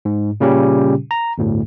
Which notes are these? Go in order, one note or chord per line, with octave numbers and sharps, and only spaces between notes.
G#2
A#2 C#3 G3 C#4 G4
A#5
G1 D2 A2